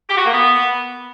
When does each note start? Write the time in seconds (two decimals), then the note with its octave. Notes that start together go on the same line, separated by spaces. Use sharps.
0.09 G4
0.17 F#4
0.25 A#3
0.33 B3